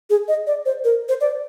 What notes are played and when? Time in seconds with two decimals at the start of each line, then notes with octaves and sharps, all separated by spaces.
0.10 G#4
0.28 D#5
0.47 D5
0.66 C5
0.84 A#4
1.09 C5
1.21 D5